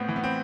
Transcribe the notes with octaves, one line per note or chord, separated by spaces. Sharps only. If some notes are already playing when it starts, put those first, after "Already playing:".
Already playing: A2 B3 C4
E3
B3
C4